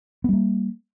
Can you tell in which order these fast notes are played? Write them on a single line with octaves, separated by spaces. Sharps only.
B3 G3 A#3